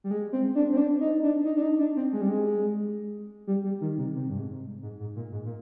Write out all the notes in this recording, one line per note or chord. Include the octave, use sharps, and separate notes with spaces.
G3
G#3
C4
D4
C4
D4
D#4
D4
D#4
D4
D#4
D4
C4
G#3
G3
G#3
G3
G3
D#3
C3
C3
G2
G#2
G#2
G#2
A#2
G#2
A#2